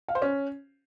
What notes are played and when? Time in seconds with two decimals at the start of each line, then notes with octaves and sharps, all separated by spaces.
0.08 F5
0.15 C5
0.22 C#4